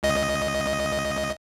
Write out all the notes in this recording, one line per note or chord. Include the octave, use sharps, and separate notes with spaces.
C#2 D#5